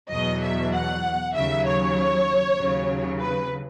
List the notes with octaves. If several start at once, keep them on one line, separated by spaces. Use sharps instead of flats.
E2 B2 F#3 D#5
E5
F#5
D#2 C#3 F#3 E5
C#5
D#2 C#3 F#3
B4